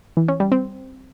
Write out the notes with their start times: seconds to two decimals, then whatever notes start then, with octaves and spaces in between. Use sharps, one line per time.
0.17 E3
0.28 C#4
0.40 G3
0.52 C4